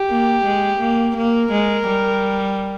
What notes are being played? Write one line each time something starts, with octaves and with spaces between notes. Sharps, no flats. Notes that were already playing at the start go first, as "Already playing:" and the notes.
Already playing: G4
A#3
G#3
A#3
A#3 A#4
G#3
G3